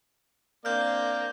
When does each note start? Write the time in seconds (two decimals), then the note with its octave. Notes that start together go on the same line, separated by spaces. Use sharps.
0.65 A#3 C4 D4 D5 F6 G6